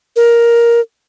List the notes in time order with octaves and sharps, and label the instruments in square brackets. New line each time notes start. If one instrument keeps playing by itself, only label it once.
[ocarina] A#4